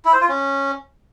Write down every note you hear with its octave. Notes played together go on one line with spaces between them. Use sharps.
E4
C5
F4
C#4